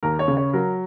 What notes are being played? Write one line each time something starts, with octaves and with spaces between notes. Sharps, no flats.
D#2 A#4
C#5
C#3
C#5
F#3 A#4